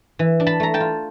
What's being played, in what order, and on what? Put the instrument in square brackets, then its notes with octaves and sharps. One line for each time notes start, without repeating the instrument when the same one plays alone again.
[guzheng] E3
D4
A5 B5
A3 A#5
G5 A5
F4